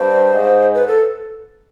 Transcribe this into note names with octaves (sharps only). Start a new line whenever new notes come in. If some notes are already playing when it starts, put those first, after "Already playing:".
Already playing: G2 C5
G#2
B4
A4